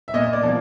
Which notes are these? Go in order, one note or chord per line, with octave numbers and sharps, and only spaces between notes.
E5
A#2 D#5
D5
F3 A#3